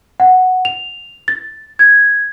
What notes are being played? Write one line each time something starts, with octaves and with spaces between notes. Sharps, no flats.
F#5
F7
A6
G#6